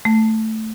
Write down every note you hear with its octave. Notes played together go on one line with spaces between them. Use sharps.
A3